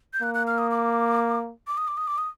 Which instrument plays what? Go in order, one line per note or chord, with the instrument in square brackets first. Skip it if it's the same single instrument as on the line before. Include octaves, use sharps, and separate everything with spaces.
[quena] G6
[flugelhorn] A#3 [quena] F#6
[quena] F#6
F6
D#6
D6
D6
D#6
D6
D#6
D6
D#6